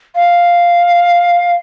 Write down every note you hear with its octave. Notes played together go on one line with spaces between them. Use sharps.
F5